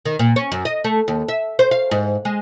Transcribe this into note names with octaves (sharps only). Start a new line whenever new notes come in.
D#3
A#2
C#4
F#2
D#5
A3
D#2
E5
C5
F5
G#2
G#3